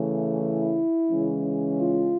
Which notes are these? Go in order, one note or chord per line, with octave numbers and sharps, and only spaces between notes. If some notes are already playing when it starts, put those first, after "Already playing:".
Already playing: C#3 E3 A3
E4
C#3 E3 G#3 C#4
F4